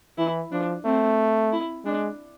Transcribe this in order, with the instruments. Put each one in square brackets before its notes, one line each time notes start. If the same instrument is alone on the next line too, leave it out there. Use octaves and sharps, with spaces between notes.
[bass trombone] E3 [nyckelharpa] E4
[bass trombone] F3 [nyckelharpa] D4
[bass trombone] A3 [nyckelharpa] C4
[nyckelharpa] E4
[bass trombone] G#3 [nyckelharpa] D4